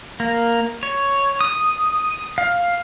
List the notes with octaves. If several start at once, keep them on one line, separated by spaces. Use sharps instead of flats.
A#3
C#5
D#6
F5